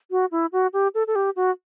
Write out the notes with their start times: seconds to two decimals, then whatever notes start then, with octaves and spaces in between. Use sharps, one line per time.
0.11 F#4
0.32 E4
0.52 F#4
0.73 G4
0.95 A4
1.07 A4
1.16 G4
1.36 F#4